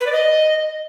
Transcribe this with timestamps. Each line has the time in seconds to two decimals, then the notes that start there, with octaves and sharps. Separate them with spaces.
0.01 B4
0.06 D5
0.12 D#5